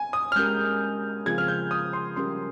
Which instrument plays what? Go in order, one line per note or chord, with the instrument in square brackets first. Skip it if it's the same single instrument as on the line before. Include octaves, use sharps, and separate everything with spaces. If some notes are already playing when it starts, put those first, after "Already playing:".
Already playing: [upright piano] G#5
D#6
F6
[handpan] G#3 C#4 G4 A#4 [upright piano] G6
[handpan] C#3 F3 C4 F4 G#4 [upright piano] G#6
[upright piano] F6
G6
D#6
C6
[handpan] G3 C#4 G4 A#4 [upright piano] C6